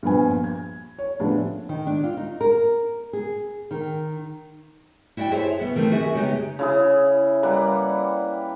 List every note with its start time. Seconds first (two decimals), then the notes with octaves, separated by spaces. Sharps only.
0.03 G2 A#2 F3 B3 B4 G#5
0.44 G#6
0.99 C#5
1.20 A2 F3 B3 C#4 D4 G4
1.69 D#3
1.87 D4
2.04 F4
2.17 D#4
2.41 A#4
3.13 G#4
3.71 D#3
5.17 E4 F#4 D5 F5 G5
5.31 E4 G#4 A4 C5 C#5 E5
5.60 B2 B3 F#4
5.75 D#3 E3 A3 A#3 C4
5.92 F#4 G#4 E5 G#5
6.15 C#3 G#3 B3 D#4 F#4 G4
6.59 C#3 E4 G#4
7.43 G3 A#3 B4 F#5